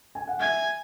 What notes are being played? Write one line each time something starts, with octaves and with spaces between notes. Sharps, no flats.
G#5
F#5
E5 G#5